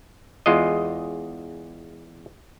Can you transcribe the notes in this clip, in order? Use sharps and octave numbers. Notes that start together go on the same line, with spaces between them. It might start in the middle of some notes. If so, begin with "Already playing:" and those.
E2 G#3 F4 D#5